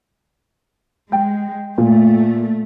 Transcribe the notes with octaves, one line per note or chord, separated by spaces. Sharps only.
G#3 G5
A#2 A3